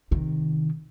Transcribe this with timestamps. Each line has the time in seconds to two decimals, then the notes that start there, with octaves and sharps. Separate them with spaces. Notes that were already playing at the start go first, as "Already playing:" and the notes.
0.11 C3 D#3